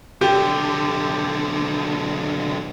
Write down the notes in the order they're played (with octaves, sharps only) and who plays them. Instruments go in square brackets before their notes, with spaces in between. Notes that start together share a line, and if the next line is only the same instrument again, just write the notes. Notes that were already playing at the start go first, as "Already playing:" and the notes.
[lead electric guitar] B1 D3 [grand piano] G4